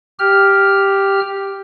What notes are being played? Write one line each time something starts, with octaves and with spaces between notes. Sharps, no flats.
G4 F6